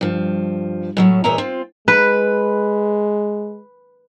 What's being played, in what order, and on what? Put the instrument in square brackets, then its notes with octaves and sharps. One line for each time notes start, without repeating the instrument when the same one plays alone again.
[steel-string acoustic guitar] G2 F3
A2 F#3 C#4
E2 A#2 C#5 D#5 E5 A#5
C4 F4
[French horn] G#3 [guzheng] B4